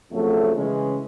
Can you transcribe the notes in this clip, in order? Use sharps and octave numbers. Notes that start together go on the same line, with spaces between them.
F2 C#3 F#3 A3
C#3 E3 G#3 C#4